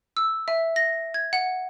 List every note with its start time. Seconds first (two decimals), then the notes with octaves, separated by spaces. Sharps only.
0.17 E6
0.48 E5
0.76 A#6
1.14 G#6
1.33 F#5